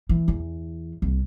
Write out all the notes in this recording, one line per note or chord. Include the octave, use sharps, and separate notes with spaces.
E3
E2
C2